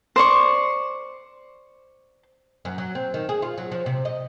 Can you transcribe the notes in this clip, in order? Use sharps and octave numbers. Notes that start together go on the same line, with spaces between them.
C5 D5 C#6
F#2
F#3
C4
D#3
G#4
F4
F#3
F3
C3
D#5